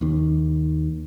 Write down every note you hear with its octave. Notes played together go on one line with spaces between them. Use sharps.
D#2 D#3